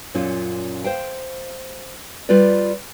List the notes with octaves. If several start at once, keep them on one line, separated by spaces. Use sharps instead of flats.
F#2 A#2 C#4 F4
C5 F5 G5
G3 F4 B4 D5